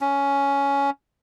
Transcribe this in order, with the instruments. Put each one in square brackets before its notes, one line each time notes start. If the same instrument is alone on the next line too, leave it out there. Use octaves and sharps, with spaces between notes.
[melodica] C#4